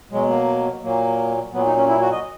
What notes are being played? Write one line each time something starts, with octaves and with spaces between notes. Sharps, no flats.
B2 F#3 G#3
A#3
A#2 F#3 A#3
A#2 F#3 B3
D#4
C#4
E4
F#4
D#5